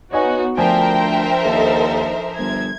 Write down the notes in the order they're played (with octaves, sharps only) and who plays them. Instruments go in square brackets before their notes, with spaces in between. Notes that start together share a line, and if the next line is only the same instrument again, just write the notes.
[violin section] B3 D#4 F#4 [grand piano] C#5 D#5 G#5
[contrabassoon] D2 [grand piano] F3 D4 G#5 [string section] A#4 C5 E5 [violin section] G5
[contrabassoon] D#2 [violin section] D#4 A4
[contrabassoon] G1 [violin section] G#6